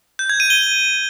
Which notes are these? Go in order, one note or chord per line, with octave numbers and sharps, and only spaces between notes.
G6
G#6
D#7
G7